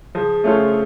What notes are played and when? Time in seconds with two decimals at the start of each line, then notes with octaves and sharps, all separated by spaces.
0.15 F3 G#4
0.44 A3 C#4 F4 A4